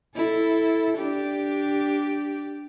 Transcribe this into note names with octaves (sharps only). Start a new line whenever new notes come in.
E4 A4
D4 G4